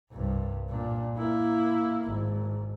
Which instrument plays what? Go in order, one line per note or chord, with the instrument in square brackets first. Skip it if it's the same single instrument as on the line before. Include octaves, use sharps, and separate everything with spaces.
[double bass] C2 G2
A#2 D4
A#3 E4
G#1